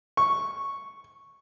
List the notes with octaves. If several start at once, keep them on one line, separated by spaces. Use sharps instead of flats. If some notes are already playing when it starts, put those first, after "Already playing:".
C#6